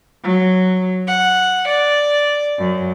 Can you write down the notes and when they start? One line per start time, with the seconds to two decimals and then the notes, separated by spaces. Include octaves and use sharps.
0.23 F#3
1.06 F#5
1.67 D5
2.57 F#2